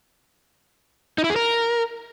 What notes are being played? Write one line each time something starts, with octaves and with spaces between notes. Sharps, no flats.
D#4
E4
G#4
A#4